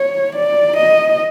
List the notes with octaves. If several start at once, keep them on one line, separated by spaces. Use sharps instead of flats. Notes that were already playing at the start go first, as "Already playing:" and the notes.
Already playing: C#5
D5
D#5